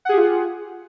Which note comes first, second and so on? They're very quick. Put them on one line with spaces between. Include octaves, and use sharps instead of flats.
F#5 G#4 G4 F4